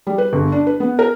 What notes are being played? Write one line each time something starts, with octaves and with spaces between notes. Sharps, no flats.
G3
B4
G1
D4
B4
B3
A#4